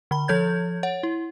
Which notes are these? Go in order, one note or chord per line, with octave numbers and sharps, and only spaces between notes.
D3 B5
F3 A4 C#5 G6 G#6
C#5 F#5
E4